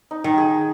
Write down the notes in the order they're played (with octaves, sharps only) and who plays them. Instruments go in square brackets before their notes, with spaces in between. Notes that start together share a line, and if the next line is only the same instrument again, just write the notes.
[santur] D#4
[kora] D#3
[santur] G#4